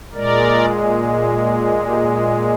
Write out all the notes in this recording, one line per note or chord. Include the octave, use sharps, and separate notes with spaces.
A#2 G#3 A#4 D5
G4 A#4
F4 G#4